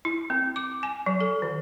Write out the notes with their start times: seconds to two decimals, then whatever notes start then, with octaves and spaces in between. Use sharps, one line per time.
0.05 E4
0.30 C4
0.56 D6
0.83 G#5
1.06 F#3
1.20 A4
1.42 D#3